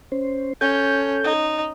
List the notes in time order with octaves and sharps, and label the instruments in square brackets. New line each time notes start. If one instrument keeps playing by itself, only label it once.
[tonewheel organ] C#4 C5
[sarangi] C#4 [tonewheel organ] A4 G6
[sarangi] D#4